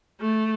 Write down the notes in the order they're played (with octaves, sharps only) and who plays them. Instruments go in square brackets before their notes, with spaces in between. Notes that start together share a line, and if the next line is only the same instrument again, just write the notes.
[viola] A3